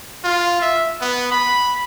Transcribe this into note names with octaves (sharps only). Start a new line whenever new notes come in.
F4
E5
B3
B5